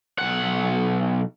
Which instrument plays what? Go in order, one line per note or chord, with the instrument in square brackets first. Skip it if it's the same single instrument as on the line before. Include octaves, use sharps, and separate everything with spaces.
[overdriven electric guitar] B1 F#5